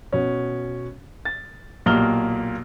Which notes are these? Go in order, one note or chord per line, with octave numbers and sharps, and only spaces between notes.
B2 C#4
A6
B1 A#2 A#3 G4 F6 G7